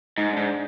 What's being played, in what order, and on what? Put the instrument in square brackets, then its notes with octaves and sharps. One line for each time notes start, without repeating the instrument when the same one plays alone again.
[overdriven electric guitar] G#2 [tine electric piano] D#4
[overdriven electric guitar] G#2 [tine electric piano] D4